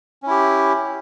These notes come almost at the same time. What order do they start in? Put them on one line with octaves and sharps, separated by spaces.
C#4 E4 G4